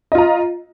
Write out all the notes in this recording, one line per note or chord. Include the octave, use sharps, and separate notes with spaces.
F4 D#5 A#5